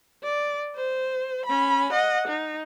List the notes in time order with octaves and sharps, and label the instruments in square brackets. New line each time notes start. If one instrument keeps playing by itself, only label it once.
[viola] D5
C5
C#4 B5
D#5 F#5
D#4